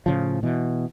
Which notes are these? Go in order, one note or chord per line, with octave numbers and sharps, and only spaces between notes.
A2 C#3 F3
B2 E3